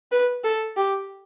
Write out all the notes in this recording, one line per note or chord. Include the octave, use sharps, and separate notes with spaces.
B4
A4
G4